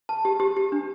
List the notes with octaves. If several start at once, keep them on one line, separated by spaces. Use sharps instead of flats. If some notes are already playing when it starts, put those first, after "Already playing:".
A5
G4
G4
G4
D4